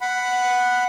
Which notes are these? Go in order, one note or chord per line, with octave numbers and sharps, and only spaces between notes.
F#5 B5